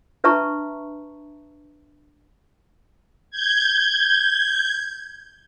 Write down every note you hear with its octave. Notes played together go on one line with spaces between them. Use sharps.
D4 B4 E5 A5 A#5 C#6
G6 G#6